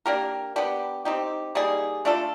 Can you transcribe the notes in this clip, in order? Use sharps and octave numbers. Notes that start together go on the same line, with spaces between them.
A#3 D4 G4 A#4
B3 D4 G4
C4 D#4 G4
G3 A#3 D#4 G#4
A3 D4 F4 A4